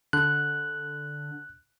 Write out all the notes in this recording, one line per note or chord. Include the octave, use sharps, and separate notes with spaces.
D3 F#6